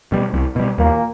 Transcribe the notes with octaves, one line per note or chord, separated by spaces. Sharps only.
B2 G3
C2
B2 G3
D#2 A#2 A#3